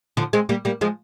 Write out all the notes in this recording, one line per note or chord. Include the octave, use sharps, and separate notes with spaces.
D3 F3
G#3 C4
G3 A#3
G3 A#3
F3 G#3